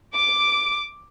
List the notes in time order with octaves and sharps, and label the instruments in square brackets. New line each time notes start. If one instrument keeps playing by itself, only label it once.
[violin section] D6